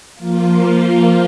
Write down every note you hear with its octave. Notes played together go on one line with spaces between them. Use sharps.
F3 A#3 F4